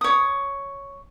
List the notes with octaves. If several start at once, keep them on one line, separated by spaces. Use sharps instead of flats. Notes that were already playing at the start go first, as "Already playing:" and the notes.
C#5 D#6